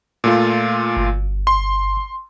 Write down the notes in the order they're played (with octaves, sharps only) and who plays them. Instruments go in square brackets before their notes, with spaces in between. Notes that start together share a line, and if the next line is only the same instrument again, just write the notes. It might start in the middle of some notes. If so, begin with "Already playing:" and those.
[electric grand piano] A#2 A3 F4
[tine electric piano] G1
[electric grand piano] C6